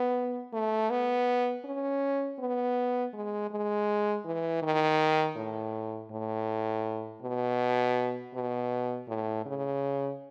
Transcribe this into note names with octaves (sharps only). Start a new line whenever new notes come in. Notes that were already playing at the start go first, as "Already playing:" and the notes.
Already playing: B3
A3
B3
C#4
B3
G#3
G#3
E3
D#3
A2
A2
B2
B2
A2
C#3